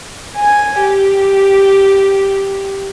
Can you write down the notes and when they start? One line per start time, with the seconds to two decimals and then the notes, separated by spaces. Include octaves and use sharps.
0.35 G#5
0.81 G4